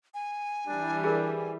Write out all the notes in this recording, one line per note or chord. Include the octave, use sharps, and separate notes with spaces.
G#5
E3 G3 D4
G#4 A#4